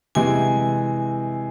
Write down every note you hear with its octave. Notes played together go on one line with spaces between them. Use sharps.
C3 E3 G#3 G#5